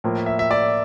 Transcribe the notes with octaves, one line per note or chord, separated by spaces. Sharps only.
A2 F3 A#3
E5
E5
D5